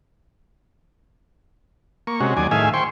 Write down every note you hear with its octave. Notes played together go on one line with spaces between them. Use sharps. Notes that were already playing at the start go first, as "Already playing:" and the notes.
A#3 C#6
C3 G#3 C#4 F#4
D#2 F#3 D5 G#5
A2 D#3 G#4 E5 F5 G#5
C5 G5 C6 C#6